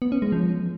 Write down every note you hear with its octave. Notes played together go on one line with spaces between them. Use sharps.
B3
C#4
G#3
F3